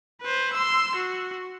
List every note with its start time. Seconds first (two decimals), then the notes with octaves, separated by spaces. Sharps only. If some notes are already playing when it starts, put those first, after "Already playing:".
0.21 B4 C5
0.53 C6 E6
0.95 F#4